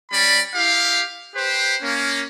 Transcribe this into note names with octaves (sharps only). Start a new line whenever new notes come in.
G3 C#4 D5 B5
E4 G4 F5
G4 B4 C5
A#3 C#4